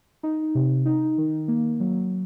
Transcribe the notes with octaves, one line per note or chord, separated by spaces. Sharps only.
D#4
C3
D#4
D#3
A#3
F#3